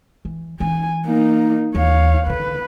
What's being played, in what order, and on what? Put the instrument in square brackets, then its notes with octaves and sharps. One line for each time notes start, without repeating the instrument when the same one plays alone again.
[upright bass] E3
[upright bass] E3 C#4 [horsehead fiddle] G#5
[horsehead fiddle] A#3 D#4
[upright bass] D#2 E3 [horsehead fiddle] C#5 F5
[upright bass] D3 D#3 [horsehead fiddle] B4